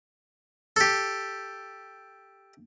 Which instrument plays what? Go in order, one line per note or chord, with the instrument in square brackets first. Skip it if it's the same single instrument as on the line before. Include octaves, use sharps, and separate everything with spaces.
[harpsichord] G4 A4